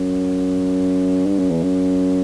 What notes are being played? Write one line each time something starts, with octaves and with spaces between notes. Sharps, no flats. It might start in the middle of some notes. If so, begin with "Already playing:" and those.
Already playing: F#2
G2
F#2
E2
F#2